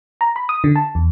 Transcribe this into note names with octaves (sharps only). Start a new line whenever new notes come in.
A#5
B5
D#6
D3
A5
E2